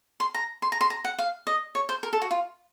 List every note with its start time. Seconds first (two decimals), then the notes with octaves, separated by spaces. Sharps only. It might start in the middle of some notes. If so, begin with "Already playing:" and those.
0.20 C6
0.34 A#5
0.62 C6
0.72 A#5
0.81 C6
0.90 A#5
1.04 F#5
1.18 F5
1.47 D#5
1.75 C#5
1.89 C5
2.03 A#4
2.13 A4
2.22 F#4
2.31 F4